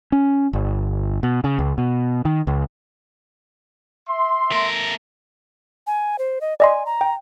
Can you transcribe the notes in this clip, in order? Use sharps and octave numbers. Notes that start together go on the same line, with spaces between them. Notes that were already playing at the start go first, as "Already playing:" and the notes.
C#4
G1
B2
C#3
C#2
B2
D#3
C#2
E5 C6
A3 A#4
G#5
C5
D#5
D5 D#5 G#5 C6
A#5
G5